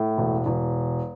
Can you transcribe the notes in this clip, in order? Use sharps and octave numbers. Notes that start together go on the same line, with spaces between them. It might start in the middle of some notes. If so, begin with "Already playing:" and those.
Already playing: A2
E1
E1